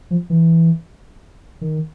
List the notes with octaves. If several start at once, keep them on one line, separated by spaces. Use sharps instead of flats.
F3
E3
D#3